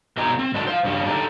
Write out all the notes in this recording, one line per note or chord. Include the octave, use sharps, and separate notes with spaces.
B2 B3 D#4 G4 G#4 A#5
C4
G#2 D3 D4 F#4 A5
C5 F5
G2 C#3 F3 G3
D4 D#4 G4 A4